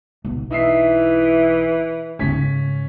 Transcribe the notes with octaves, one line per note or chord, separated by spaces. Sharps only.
B1
E3 D#4 E5 C7
G#2 C#3 C#4 B6